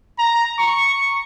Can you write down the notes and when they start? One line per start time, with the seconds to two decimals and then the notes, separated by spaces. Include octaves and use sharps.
0.19 A#5
0.59 C#6